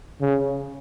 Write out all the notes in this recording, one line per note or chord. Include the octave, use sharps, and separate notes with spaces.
C#3